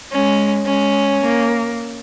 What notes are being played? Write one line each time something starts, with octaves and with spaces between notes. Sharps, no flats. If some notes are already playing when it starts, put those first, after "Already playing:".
G#3 C#4
G#3 C#4
A#3